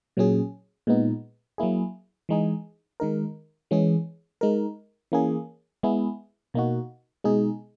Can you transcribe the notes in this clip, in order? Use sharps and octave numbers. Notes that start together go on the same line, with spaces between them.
A#2 F#3 C#4 G#4
A#2 G#3 B3 D#4
F#3 A#3 E4 G#4
E3 G#3 D#4 G#4
D#3 G#3 D#4 A#4
E3 G#3 C#4 G#4
G#3 D#4 A#4
E3 A#3 C#4 G#4
G#3 B3 E4 G#4
B2 A#3 D#4 F#4
B2 G#3 D#4 G#4